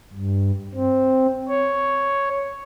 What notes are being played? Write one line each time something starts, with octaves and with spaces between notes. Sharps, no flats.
G2
C4
C#5